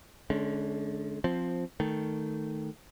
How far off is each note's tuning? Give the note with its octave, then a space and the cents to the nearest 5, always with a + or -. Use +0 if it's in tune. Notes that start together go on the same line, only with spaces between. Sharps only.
D3 +0 G#3 +35 C#4 +5
F3 +5 C4 +0
D#3 +0 A3 +0